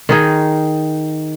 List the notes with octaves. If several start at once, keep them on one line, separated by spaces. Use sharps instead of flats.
D#3 D#4 G#4